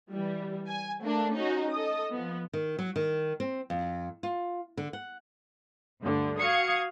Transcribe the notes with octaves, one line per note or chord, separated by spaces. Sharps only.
E3 G3
G#5
A3 A#3 D4
C#4 D#4 F#4
A4 D#5 D#6
F3 B3
D#3
F#3
D#3
C4
F2
F4
D3
F#5
D2 G2 D3
F#4 F5 D#6 G#6 C#7